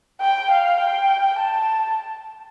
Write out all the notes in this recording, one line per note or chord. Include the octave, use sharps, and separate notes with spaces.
G5
F5
G5
A5